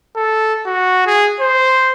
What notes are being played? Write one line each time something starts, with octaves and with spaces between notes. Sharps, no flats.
A4
F#4
G#4
C5